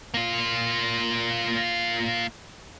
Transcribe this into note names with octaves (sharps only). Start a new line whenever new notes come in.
A#3 F4